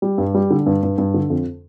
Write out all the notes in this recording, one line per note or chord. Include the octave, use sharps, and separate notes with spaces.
G3
G2
G3
D3
G2
G2
G2
D3
F2